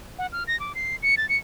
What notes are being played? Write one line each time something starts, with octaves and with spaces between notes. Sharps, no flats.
F#5
F6
A#6
D6
C7
C#7
A6
C#7